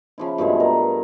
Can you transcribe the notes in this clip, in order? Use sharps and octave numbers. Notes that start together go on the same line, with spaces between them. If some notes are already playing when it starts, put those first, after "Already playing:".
C#3 F3 E4
G2 B2 G#3 A3
A#4